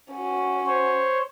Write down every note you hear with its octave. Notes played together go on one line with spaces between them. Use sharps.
C#4 F#4
C5 C#5